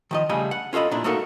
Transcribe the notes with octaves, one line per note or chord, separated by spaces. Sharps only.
D#3 F3 D#5
C#3 G3 A3 D#5 G#5
F#5
C#4 F4 A4 D#5 B5
A#2 D4 E4
A3 A#3 D#4 F#4 A4 A#4